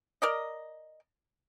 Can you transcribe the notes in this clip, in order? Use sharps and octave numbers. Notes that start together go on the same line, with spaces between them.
A#4 D5 D#5